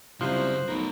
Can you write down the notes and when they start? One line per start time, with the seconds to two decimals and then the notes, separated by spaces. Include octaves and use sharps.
0.21 C2 C#3 F3 F#3 C5 F#6
0.68 B1 A3 A#4